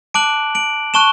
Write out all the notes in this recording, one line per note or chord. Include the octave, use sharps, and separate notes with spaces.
A5 D6 F#6 D7 F#7
D7 F#7
A5 C#6 F#6 E7 G7